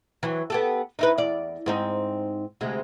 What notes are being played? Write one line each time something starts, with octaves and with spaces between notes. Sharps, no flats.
E3 F#3
B3 G4 A4
D#4 E4 B4
E2 D5
G#2 C4 D#4
D2 C3 G#3